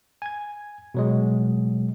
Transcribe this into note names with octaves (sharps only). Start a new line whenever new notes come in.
G#5 G#6
B2 F#3 G#3